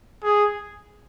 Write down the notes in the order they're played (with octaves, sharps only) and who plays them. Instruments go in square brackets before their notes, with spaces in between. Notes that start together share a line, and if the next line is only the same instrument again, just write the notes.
[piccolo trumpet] G#4